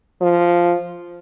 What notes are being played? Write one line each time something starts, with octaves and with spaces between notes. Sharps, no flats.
F3